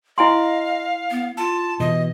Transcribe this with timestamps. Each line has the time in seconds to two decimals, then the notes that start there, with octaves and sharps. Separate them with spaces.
0.18 E4 D#5 F5 G#5 C6
1.11 B3
1.37 F4 A5
1.80 B2 E3 D#5